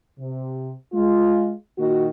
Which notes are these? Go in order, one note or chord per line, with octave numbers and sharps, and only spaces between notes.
C3
G#3 F4
A#2 D#3 F#4